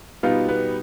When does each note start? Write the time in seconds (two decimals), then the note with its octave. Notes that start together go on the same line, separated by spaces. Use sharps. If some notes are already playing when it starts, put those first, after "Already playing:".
0.23 B2 G3 B3 D#4 F4 F5
0.48 B3 B4